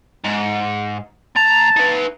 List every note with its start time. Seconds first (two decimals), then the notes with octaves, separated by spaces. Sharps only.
0.25 G#2
1.36 D#2 A5 A#5
1.77 D#4 B4